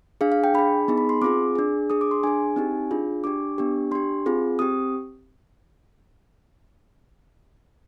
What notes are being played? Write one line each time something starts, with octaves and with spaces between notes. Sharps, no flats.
D4 G#4 F5
F5
G5
D4 G#4 B5
B3 D#4 G#4
B5
C6
C4 F4 G#4 D6
D4 G#4
D4 G#4 D#6
D6
C6
D4 G#4 G#5
C4 D#4 G4
D4 F4 G#4
D4 G4 D6
B3 D4 G4
D4 G4 C6
C4 F4 G#4
C4 G4 D#6